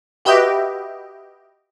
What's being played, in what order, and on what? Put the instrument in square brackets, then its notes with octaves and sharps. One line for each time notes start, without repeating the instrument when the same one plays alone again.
[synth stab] F#4 G4 B4 D#5 E5 G5